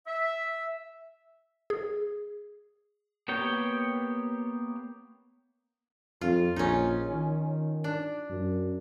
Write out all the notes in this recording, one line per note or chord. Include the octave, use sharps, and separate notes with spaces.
E5
G#4
A#3 B3 G4 C#5 G5
F2 F4
A#1 C#4 D#4
D#3
D4
F#2